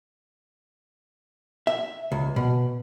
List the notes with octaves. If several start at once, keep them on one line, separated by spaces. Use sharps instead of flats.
E5
C#2
B2